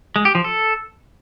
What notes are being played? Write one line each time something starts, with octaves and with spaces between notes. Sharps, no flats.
G#3
G4
F3
A4